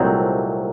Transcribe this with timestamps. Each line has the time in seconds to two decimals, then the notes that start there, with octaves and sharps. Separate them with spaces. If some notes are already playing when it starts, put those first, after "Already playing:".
Already playing: C2 A#2 F#3 A3 C4 D#4